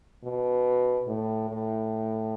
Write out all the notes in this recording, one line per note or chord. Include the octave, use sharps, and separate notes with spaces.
B2
A2
A2